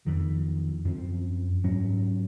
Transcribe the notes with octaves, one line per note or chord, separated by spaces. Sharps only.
F2 D#3 F#3
F#2 F3 C4
G#2 F#3 C#4